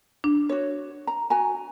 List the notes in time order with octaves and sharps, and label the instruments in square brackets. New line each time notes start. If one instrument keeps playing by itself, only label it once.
[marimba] D4
[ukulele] F#4 C#5
A#5
F#4 G#5 A#5